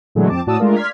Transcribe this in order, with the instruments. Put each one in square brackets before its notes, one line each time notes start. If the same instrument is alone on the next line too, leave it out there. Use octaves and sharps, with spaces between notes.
[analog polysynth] A#2 D3 E3 F#3 G#3 A3
F2 C4 A5 D6
A2 F#4 D5 A5 D#6 E6
G#3 A3 D4 F4 A#4
D5 F5 C6 F6 G#6 B6